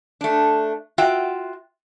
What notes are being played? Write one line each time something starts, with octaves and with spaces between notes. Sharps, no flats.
A3 D4
F4 F#4 E5 G5